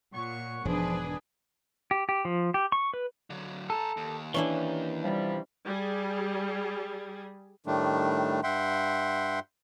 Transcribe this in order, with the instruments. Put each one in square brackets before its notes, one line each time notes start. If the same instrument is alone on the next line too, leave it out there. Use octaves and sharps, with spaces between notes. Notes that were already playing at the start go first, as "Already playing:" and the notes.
[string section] A#2 [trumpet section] C#5 F#5 C#6
[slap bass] E1 G#2 [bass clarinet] F3 [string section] D4 B4 [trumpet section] G#4
[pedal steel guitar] G4
G4
F3
G4
C#6
B4
[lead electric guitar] D3 F#3
[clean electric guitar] A4 [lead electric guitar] G#5 A#5
[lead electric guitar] D#2
[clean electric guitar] E3 [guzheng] C#4 D4 E4
[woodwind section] C3 F3 G3
[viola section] G3 G#4
[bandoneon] A2 D#3 G3 A3 D4
G2 E5 F#5 G5 C6